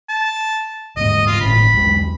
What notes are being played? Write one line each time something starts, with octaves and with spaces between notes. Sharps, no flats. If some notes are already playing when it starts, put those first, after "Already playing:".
A5
D#1 G#2 D#5
F4
G1 A2 C#4 B5
B1 E2 G#3